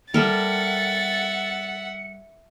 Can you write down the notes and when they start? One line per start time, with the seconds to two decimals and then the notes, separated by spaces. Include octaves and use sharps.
0.14 G3 A4 A#4 E5 F#5 A6 C#7